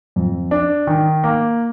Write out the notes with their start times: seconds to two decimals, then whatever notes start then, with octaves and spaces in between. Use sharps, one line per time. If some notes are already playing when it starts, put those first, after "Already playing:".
0.16 F2
0.51 D4
0.87 D#3
1.24 A#3